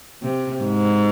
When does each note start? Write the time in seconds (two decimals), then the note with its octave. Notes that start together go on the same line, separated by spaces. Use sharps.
0.23 C3
0.63 G#2